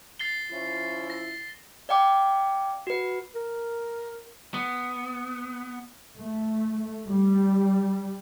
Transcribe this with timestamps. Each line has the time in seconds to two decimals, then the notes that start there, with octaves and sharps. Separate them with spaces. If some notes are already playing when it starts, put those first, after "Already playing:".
0.19 A6 C7 G7
0.51 F3 C#4 E4
1.10 A#6
1.89 D5 F5 G5 D6
2.87 F#4 B4
3.35 A#4
4.54 B3
6.18 A3
7.08 G3